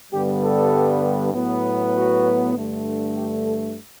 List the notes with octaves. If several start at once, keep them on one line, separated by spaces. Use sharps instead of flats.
G2 D3 G3 B3 G4
A4
A2 F#3 B3
F#4
G2 D3 A3
G4
A4